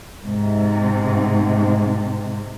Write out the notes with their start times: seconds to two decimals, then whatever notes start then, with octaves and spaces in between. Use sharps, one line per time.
0.24 G#2 C3